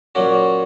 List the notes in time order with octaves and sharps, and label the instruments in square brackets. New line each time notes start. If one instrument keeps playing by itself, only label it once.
[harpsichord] A#2 F#3 A#3 C#4 F#4